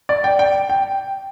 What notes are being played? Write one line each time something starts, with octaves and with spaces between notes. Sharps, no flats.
D5
G5
G5
G5